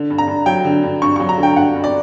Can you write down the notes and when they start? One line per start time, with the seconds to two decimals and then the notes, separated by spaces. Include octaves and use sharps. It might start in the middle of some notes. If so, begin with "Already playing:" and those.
Already playing: D3
0.10 G2
0.18 A#5
0.28 G2
0.46 F#3 G5
0.65 D3
0.83 G2
1.02 G2 C#6
1.16 C#6
1.20 F#3
1.29 A#5
1.38 D3
1.43 G5
1.56 G2 F#5
1.76 G2
1.84 D5